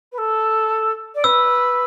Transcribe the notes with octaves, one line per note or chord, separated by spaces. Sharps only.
B4
A4
D5
B4 E6